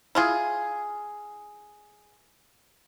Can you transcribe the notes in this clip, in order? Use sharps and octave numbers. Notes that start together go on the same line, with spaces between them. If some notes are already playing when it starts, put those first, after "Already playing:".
E4 F4 G#4